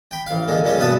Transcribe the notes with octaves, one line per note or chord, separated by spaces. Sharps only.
G5 B5
A1 F5
A#2 D3 G#3
A#2 G3 G#3 C#4
B1 G2 B3 B4 F#5 A5